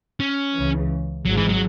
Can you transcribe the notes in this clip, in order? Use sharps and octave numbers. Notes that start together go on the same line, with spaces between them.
C#4
C#2 C#3 E3
G#1 G#2 F#3 G#3
E3
F#3